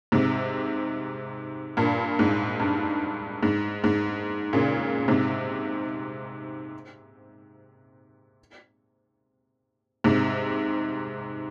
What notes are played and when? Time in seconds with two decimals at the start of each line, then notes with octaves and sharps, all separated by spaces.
0.12 G#2 C3
1.77 G2 A#2
2.19 G#2
2.60 G2
3.43 G#2
3.84 G#2
4.53 A#2 C#3
5.08 G#2 C3
10.04 G#2 C3